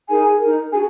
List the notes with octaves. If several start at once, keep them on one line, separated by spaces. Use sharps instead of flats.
D#4 G#4 A#4 G#5
D#4 A#4
D4 F#4 G#4 G#5